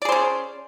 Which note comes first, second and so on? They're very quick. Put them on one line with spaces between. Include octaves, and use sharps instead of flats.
D5 G#4 C5 C#4